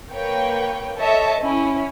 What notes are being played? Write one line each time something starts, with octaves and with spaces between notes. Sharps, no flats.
A#3 B4 C#5 G5
A4 C#5 D#5 E5 A5
C#4 E4